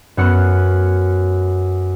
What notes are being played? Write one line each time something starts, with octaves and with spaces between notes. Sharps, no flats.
F#2 B3 C#5 F#5 F6 C#7